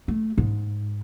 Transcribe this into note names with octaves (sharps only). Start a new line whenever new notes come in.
A3
G#2